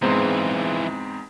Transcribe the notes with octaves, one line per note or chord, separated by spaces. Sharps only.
E2 G#2 E3 F3 C4